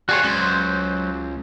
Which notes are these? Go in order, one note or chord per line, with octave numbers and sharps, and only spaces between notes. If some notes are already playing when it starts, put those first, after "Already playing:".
G3 F4 F#4 G#4 C#5
C#2 F#3 C5